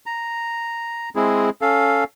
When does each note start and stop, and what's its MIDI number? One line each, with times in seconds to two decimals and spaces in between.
0.06 1.09 82
1.16 1.50 56
1.16 1.50 60
1.16 1.50 64
1.16 1.50 68
1.61 2.04 61
1.61 2.04 69
1.61 2.04 77